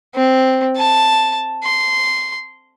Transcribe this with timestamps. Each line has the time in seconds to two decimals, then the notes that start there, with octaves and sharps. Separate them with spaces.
0.15 C4
0.77 A5
1.64 C6